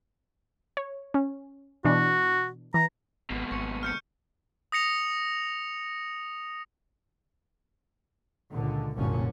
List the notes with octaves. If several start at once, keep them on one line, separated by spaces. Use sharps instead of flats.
C#5
C#4
B2 E3 D4 F#4
E3 A#5
G#1 C#2 B2
G#1 C#6 C#7
F6 G6 C#7
D#6 A#6 C#7 F7
C#2 A#2 D3
F#1 C2 F#2 A#2 D3 C#4